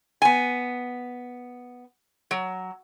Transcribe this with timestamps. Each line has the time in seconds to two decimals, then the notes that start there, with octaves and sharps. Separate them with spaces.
0.22 B3 G#5
2.31 F#3